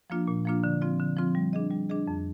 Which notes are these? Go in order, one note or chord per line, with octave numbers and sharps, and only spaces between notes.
F3 A#3 D4 F4
A#2
F3 A#3 D4 F4
D3
F3 C4 F4
D3
F3 C4 F4
G3
D4 G#4 D#5
G3
D4 G#4 D#5
F2